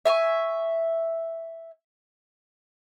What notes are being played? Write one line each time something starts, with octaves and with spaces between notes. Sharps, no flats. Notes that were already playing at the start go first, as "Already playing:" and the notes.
E5 G#5 A5 C#6